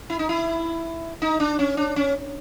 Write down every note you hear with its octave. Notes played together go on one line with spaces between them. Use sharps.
E4
D#4
E4
D#4
D4
C#4
D4
C#4